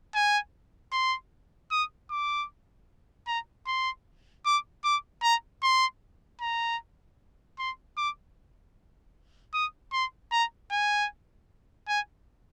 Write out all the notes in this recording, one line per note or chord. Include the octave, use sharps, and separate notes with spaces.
G#5
C6
D#6
D6
A#5
C6
D6
D6
A#5
C6
A#5
C6
D6
D#6
C6
A#5
G#5
G#5